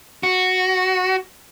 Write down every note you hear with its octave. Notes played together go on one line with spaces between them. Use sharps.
F#4